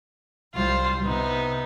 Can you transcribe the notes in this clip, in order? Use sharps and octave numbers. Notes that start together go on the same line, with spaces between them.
C2 G3 F4 C5
C3 B3 D#4